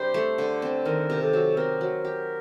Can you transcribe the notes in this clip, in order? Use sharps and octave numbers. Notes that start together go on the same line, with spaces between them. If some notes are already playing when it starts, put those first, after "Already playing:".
Already playing: C3 G3 D4 G4 C5
A3
D3
C4
D#3 A#4
C3
A4
F#3
C4 A#4
F#3
G4